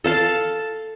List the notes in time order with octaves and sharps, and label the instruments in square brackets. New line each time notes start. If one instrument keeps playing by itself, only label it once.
[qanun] A4 F5 A5